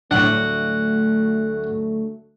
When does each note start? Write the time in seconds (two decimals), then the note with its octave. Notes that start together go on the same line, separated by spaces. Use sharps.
0.11 D2 A2 F#3 A3 D4 F#5